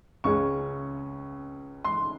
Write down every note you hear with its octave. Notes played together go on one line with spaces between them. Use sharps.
C#2 C#3 G#3 C#4 C#6
C6